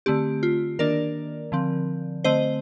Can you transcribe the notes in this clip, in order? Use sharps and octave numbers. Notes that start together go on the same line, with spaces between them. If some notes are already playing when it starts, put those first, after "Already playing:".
D3 A3 C4 G4
F4
D#3 A#3 D4 A#4 D5
D3 F3 C4
D3 A3 C4 C5 D#5